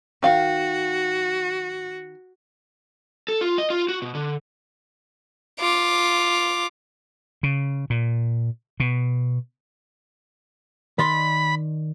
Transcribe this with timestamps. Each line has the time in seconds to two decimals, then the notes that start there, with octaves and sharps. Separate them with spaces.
0.23 D#3 F#4 F5
3.28 A4
3.41 F4
3.58 D#5
3.70 F4
3.89 F#4
4.02 B2
4.15 D3
5.60 F4 D6
7.43 C#3
7.90 A#2
8.80 B2
10.99 D#3 D5 B5 C6